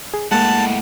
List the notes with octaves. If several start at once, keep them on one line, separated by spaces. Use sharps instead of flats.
G#4
A2 G#3 A#3 F#5 A5